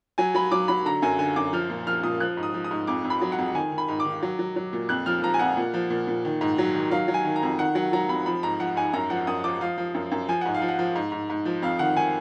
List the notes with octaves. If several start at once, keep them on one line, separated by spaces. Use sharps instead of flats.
F#3 G#5
F#3 B5
F#3 D6
F#3 B5
D3 A#5
F#2 G#5
D3 G#5
F#2 D6
F3 F6
A#2
F3 F6
A#2 D#6
F3 F#6
G#2
D#6
F3
D#6
G#2
F2 D6
F2
B5
F#3
F#5
F2
D#3 G#5
D#3
B5
G#2
D6
D#3
F#3
F#3
F#3
A#2
F2 F#6
F3 F6
F3 A#5
G#5
F2 F#5
A#2
F3
A#2
A#2
D#3
G#2
F#3
D#3
F#3 F5
F#3
G#5
D#3
A#5
F2
D#3 F#5
F#3 F#5
F#3 A#5
F2 B5
F3 B5
G#2 A#5
F3 F#5
G#2 G#5
F#2 A#5
F3 F#5
F#2 D#6
F3 D6
F3 F5
F3
F#2
F#2
F3 G#5
G#2 F#5
F5
F3
F#5
F3
G#2
G#2
G#2
F3
F2 F5
D#3 F#5
D#3 G#5